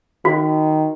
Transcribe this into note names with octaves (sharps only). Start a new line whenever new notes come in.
D#3 F#4